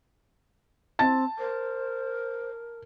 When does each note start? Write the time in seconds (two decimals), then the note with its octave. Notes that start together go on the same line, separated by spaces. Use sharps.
0.99 C4 A5 A6
1.39 A#4 C5